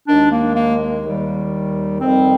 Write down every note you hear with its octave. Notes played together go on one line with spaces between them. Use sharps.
D#2 D#3 G#3 D4
A#3
A#3
D#2 D#3 G3
F2 D#3 G3 C4